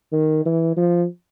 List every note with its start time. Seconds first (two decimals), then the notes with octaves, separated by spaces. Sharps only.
0.12 D#3
0.45 E3
0.76 F3